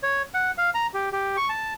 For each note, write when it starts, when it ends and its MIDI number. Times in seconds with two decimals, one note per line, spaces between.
0.03 0.22 73
0.34 0.51 78
0.58 0.70 77
0.74 0.87 82
0.94 1.09 67
1.12 1.37 67
1.37 1.49 85
1.49 1.74 81